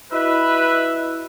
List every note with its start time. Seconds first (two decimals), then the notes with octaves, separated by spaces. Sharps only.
0.12 E4 F#4 B4 D#5 E5